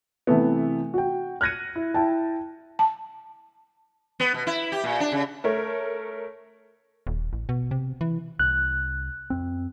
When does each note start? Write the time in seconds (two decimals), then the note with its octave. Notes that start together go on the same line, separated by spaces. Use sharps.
0.27 C3 E3 A3 B3
0.94 F#4 G5
1.41 F6 F#6 G#6 A#6 C#7 D#7
1.76 E4
1.94 E4 G5 A5
2.79 A5
4.20 B3
4.34 B2
4.47 E4
4.72 G4
4.84 A#2
5.00 D4
5.12 C#3
5.44 A3 A#4 C#5
7.07 D#1
7.33 A1
7.49 B2
7.71 C3
8.01 E3
8.39 C2 F#6
9.30 F2 C4